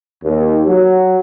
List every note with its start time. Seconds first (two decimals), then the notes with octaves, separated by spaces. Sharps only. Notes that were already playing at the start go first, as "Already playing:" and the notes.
0.24 D#2
0.68 F#3